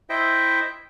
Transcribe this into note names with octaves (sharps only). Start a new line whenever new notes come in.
E4 C5 D#5 E5 G5